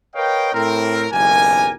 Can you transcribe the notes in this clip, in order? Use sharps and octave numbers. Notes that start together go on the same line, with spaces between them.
A#4 B4 C#5 D#5 F5 G5
A2 C4 A#4
F#1 B1 E2 G4 A#4 G#5